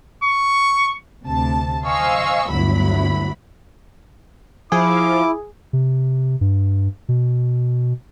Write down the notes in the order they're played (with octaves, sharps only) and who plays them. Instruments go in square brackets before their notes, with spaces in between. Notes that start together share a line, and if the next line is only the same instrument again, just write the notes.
[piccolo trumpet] C#6
[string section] D2 C3 A5
C5 D#5 F5 G#5 C#6 E6
G1 D2 F#3 E4 B5
[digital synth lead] F3 [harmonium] E4 [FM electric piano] G#4 [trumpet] D6
[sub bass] C3
G2
B2